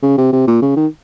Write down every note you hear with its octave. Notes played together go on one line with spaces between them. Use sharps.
C#3
C3
C3
A#2
C#3
D#3